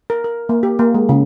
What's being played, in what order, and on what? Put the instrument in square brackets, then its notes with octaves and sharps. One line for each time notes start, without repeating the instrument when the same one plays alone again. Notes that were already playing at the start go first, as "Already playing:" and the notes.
[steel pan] A#4
A#4
A#3
G4
A#3
G#3
C#3